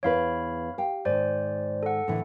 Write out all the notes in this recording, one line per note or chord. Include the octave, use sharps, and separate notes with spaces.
E2 E4 B4 C#5 F5 B5
G4 F5 G5
G#2 D#3 C5 D5
A4 F#5
A2 D3 E3